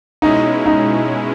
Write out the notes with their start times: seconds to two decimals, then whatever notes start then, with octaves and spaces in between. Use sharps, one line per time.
0.22 B2 G#3 C#4 D#4 E4
0.66 D#4